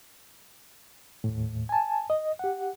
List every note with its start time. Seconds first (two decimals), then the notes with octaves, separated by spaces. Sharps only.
1.24 D#2 A2
1.69 G#5 A5
2.10 D#5
2.39 G4 F#5